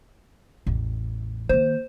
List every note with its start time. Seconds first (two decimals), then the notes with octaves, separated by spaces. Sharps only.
0.67 A1 E2
1.49 D#3 A#3 C5